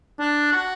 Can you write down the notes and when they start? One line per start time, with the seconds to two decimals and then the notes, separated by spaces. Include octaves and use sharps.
0.20 D4
0.52 F#4